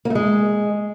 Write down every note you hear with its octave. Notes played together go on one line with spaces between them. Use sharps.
A#3
A3
G#3